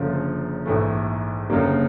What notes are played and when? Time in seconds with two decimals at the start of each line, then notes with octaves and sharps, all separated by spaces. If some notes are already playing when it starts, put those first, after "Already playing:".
Already playing: F#1 F#2 D3 F3
0.65 A#1 G#2 E3 A3
1.50 F#1 F#2 D3 G3 A#3